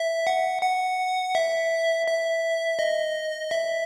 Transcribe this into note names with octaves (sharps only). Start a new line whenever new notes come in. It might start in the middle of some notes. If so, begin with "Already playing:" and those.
Already playing: E5
F#5
F#5
E5
E5
D#5
E5